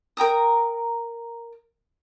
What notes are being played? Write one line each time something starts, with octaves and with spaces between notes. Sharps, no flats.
A#4 G5 A#5 D#6